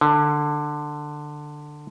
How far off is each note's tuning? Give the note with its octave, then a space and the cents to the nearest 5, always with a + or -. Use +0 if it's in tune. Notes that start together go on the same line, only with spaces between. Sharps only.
D3 +15